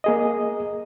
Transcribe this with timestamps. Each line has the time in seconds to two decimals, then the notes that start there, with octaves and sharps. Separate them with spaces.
0.04 A#3 G#4 D#5